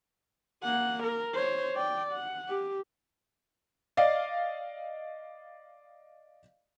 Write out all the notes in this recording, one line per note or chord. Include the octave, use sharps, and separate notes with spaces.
A#3 F#5
A#4
C5 C#5
D5 G5
F#5
G4
D5 D#5 F5